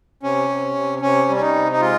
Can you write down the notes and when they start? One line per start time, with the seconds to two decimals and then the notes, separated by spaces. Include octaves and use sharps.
0.23 C3 C#4
0.49 C3
0.75 C3
1.02 C3 C#4
1.29 G3
1.36 C#4
1.41 D#4
1.55 C3
1.72 D#4
1.81 G#3 F4